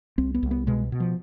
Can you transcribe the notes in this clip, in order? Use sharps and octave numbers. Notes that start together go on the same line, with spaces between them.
C2 C4
B3
C2
B3
B2 G#3
B2
F3